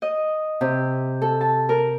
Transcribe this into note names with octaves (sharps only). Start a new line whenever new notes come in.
D#5
C3
A4
A5
A#4